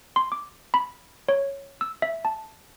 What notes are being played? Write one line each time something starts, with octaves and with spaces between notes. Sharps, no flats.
C6
D6
B5
C#5
E6
E5
A5